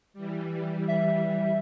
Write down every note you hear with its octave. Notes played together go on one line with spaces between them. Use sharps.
E3 G3
E5